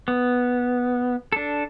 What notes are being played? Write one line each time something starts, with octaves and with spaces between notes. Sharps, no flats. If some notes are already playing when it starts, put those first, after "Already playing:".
B3
D4 A4